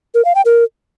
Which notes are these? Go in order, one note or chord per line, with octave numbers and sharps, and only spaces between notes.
A#4
F5
G5
A#4